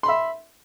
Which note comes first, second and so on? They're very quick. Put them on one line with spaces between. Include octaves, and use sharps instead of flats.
C6 B5 E5